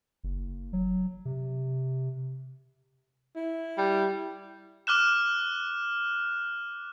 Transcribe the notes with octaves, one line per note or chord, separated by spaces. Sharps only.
F#1
F#3
C3
E4
G3
D6 F6 F#6 E7